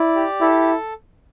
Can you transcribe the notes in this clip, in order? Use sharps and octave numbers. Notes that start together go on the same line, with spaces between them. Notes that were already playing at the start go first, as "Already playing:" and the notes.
Already playing: E4 D5
G4
E4 A4